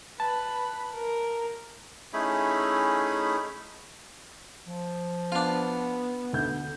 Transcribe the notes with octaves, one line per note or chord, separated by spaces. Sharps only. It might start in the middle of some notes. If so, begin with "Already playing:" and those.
B4 A5
A#4
A3 C#4 D#4 E4 G#4 B5
F3
B3 D4 F4
D2 G6